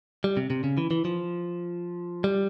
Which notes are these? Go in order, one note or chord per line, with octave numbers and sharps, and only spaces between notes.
G3
C3
C3
C#3
E3
E3
F3
G3